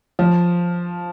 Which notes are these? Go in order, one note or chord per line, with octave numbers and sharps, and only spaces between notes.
F3